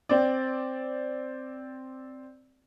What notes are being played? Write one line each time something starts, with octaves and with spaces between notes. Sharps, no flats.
C4 D5